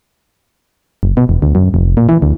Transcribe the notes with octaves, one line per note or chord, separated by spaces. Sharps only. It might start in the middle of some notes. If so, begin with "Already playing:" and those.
F#1
B2
E1
D2
F#2
F1
A#2
E3
D2